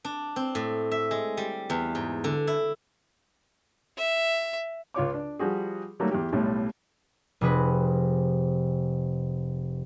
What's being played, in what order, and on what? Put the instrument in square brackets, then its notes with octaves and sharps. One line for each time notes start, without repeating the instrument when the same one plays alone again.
[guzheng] D4
C4
A2
E5
G#3
G3
E2
G#2
D3
E4
[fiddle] E5
[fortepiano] C#2 F4 C#5 D6
D4
F3 G3 F#4 G#4
D#3 F#3 G3 A3 A#3
E2 G4
B1 A2 G3 A3
[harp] F1 C3 G#4 B4